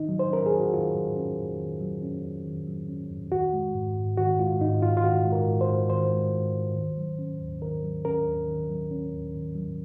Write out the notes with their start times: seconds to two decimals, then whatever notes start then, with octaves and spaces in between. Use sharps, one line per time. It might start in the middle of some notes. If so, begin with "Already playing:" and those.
Already playing: D#3 D#4
0.09 F#3
0.19 C5
0.30 C#4 A#4
0.46 G#4
0.52 F2
0.60 F#4
0.73 D#3 F4
0.95 F#3
1.16 C#4
1.38 F2
1.59 D#3
1.81 F#3
2.03 C#4
2.24 F2
2.46 D#3
2.67 F#3
2.89 C#4
3.10 F2
3.32 D#3 F#4
3.53 G#3
3.74 G#2
3.96 G#2
4.17 D#3 F#4
4.39 G#3 F4
4.61 G#2 D#4
4.83 G#2 F4
4.97 F4
5.04 D#3 F#4
5.25 G#3
5.32 A#4
5.47 G#2
5.61 C5
5.68 G#2
5.89 D#3 C5
6.11 G#3
6.33 G#2
6.54 G#2
6.75 D#3
6.98 F#3
7.19 C#4
7.41 D#2
7.62 D#3 A#4
7.83 F#3
8.05 C#4 A#4
8.27 D#2
8.48 D#3
8.70 F#3
8.91 C#4
9.13 D#2
9.34 D#3
9.56 F#3